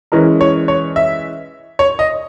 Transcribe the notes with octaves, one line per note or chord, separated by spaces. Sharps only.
E3 G#3 C#4 A#4
C#5
C#5
E5
C#5
D#5